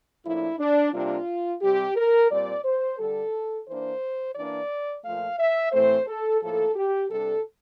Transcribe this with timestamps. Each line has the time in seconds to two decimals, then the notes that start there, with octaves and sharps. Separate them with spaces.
0.24 A2 F3 A#3 D4 E4
0.58 D4
0.92 C3 G3 A#3 D4 F4
1.61 C3 G3 C4 G4
1.96 A#4
2.30 A#2 G3 C4 D5
2.64 C5
2.98 D3 G3 D4 A4
3.67 E3 A#3 D4 C5
4.35 E3 A#3 D4 D5
5.04 A#2 F3 A3 F5
5.39 E5
5.72 A2 E3 A3 C4 C5
6.07 A4
6.41 A2 F3 A#3 A4
6.75 G4
7.10 C3 G3 D4 A4